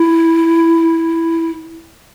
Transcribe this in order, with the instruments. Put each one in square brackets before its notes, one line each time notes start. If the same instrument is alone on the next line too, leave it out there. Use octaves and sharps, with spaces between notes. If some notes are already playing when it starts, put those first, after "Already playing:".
Already playing: [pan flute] E4